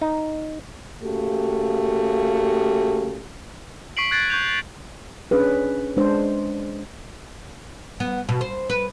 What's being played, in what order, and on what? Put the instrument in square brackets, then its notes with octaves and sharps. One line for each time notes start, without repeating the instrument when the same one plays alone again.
[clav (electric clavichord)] D#4
[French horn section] C#3 A3 A#3 F#4 G4
[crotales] C#6 B6 C7 D7 F#7
F#6 G#6 A6 C7 D7
C#6 G6 F7
[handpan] C#4 D4 G#4 B4
G#3 D4 C5
[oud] B3
B2
C5
B4